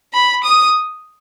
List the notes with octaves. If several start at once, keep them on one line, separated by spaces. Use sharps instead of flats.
B5
D#6